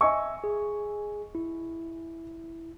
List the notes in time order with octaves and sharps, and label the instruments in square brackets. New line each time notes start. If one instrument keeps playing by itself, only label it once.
[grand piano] D#5 G#5 C#6 [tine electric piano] E5 E6
[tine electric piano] G#4
E4